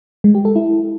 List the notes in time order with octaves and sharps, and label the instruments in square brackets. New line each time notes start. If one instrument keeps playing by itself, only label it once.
[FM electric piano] G#3
G4
A4
E4